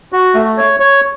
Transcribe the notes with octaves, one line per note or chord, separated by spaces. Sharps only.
F#4
A3
C#5
C#5